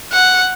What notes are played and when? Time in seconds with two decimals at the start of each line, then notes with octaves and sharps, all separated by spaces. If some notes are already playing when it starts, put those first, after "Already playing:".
0.12 F#5